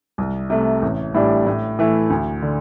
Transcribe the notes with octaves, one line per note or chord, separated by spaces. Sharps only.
C2
C3 A3
A1
A2 E3 G3 D4
A2
E3 A3 E4
D2
D3